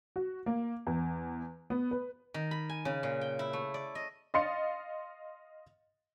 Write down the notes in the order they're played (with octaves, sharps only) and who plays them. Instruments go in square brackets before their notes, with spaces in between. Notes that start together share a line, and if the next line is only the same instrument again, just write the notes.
[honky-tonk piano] F#4
A#3
E2
B3
B4
[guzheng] D#3
B5
G#5
C#3
A#2
G5
E4
A3
D5
D#5
[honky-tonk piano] D#5 F5 C6 A6 C#7